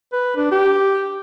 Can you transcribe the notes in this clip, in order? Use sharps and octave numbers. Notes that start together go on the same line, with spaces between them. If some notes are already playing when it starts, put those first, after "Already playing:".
B4
D4
G4